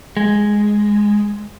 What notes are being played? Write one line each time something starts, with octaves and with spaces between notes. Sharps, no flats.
G#3